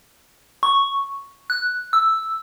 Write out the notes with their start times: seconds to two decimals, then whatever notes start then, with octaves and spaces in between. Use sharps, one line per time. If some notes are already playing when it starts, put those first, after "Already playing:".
0.63 C#6
1.50 F#6
1.93 E6